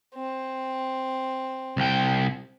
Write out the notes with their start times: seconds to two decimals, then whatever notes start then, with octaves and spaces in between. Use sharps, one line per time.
0.15 C4
1.77 C2 G5